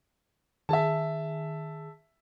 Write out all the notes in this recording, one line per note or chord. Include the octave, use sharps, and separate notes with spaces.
D#3 G#4 E5 A5